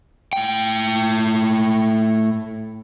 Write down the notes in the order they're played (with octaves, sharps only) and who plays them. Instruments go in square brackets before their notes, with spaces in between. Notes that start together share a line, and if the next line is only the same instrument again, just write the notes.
[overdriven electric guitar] A2 G5